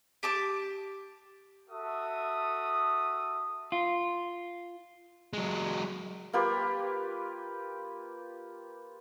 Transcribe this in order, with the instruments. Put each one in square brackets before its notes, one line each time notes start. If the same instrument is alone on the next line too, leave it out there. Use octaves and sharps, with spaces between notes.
[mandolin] G4 A5 D6
[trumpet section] F#4 A4 E5 D#6
[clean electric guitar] F4
[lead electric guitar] F#3 G#3
[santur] A#3 F4 G4 B4